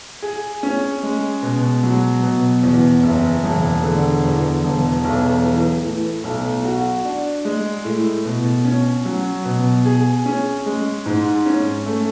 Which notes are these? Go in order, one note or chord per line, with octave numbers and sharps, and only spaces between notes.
G#4
C#4
G#3
B2
F#3
B2
E2
F#1
E1
D3
E2
E1
B1
E3
A2
B1
F#4
D4
G#3
A2
B2
C#4
F#3
B2
G#4
C#4
G#3
G#2
C#4
A3